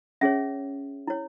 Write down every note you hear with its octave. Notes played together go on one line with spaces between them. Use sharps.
C#4 G#4 C#5 E5
E4 C#5